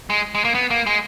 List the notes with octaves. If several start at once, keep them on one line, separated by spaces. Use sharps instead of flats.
G#3
G#3
A#3
B3
A#3
G#3